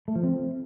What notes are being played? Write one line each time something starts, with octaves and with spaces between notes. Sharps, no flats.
A3
F3
C4